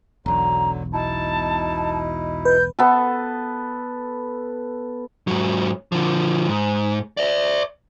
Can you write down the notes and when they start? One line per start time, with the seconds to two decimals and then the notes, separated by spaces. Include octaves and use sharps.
0.26 E1 B1 D3 F#3 A#5
0.93 B2 D#4 E4 A5
2.45 B4 G6
2.79 B3 A4
5.27 G#2 F#3
5.92 D3 F3
6.48 G#2
7.17 D5 E5